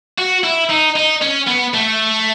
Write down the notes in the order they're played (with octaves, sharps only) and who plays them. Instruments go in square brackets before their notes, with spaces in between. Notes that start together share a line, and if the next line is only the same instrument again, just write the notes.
[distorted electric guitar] F#4
E4
D#4
D#4
C#4
B3
A3